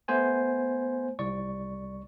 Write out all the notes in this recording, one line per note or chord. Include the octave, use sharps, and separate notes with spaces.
A3 B3 C5 G#5
C2 D5 C#6